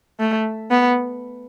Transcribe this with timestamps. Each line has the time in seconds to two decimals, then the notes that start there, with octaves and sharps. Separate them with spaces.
0.20 A3
0.70 B3